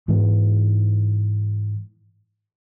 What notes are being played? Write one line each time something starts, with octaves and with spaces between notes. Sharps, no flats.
G#2 E3 G#3 B3